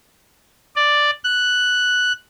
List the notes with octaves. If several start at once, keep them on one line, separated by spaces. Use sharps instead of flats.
D5
F#6